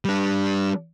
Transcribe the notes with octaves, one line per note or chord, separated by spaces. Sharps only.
G3 D4